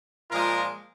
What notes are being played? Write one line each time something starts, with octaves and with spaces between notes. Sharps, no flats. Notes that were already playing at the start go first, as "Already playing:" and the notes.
A#2 F3 G#3 F4 A#4